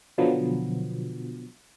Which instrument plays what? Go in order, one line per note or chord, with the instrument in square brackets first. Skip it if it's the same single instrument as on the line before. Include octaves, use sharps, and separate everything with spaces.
[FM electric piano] B2 D3 F3 F#3 B3